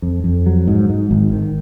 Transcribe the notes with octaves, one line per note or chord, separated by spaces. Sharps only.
F2
F2
F#3
G#2
G#2
G#1
D#3